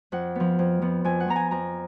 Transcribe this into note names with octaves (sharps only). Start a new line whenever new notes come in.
F2 F#5
F3 B3
F2
F3 B3
F2 G#5
F#5
F3 B3 A#5
G#5
F2 A#5